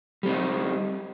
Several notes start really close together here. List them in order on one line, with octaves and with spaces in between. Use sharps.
G3 C4 D#4